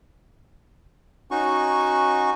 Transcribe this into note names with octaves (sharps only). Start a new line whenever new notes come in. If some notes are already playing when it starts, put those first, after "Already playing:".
C#4 D#4 F#4 C#6